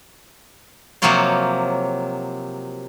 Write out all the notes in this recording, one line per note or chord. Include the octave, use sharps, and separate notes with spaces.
C3 F3 F#3 A#3 F4 C#5